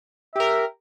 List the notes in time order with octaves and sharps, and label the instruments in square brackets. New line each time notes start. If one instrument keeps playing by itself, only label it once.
[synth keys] G4 A#4 [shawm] E5